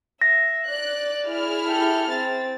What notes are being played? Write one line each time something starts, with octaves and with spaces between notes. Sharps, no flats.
E5 A#6
D5 F#6
E4 G#4 F6
G4 A4
C4 A6